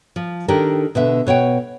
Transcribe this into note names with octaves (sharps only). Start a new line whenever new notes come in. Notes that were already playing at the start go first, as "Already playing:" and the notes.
F3
D#3 D4 G4 A4 A#4
B2 D3 E5
B2 C#5 F#5 G5